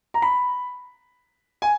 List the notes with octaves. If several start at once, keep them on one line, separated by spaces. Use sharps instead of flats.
A#5
B5
G#5